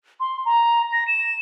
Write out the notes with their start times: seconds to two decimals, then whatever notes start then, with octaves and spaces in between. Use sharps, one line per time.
0.20 C6
0.45 A#5
0.92 A#6
1.08 E7